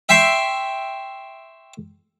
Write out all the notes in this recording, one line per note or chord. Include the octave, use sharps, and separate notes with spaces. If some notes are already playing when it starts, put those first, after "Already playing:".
E5 G5 C6 C#6